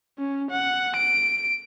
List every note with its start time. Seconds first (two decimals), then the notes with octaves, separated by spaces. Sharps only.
0.19 C#4
0.51 F#5
0.96 D7